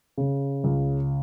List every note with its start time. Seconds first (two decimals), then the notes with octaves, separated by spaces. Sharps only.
0.18 C#3
0.64 C#2